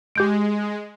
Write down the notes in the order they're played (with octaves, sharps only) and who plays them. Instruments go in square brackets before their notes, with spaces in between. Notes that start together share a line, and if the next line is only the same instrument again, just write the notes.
[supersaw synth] G#3 [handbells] G4 G6 D7